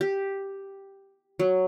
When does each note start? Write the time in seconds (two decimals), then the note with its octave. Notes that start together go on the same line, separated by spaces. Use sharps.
0.01 G4
1.39 F#3